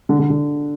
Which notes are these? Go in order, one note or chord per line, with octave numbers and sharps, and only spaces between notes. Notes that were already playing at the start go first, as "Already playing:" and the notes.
D3
D3
D3